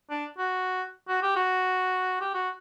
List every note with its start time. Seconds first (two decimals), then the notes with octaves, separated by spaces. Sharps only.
0.10 D4
0.38 F#4
1.08 F#4
1.23 G4
1.36 F#4
2.21 G4
2.34 F#4